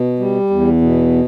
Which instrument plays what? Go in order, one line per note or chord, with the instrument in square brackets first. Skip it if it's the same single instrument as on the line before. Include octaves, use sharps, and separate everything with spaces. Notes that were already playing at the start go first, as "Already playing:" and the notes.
Already playing: [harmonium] B2
G3
E2
B2